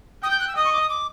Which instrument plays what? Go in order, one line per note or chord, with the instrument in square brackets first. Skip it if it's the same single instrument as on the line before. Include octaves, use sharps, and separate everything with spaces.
[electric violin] G5 [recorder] D#6
[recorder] G6
F#6
E6
[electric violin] D#5 [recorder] D#6
[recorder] C#6
D6
D#6
D6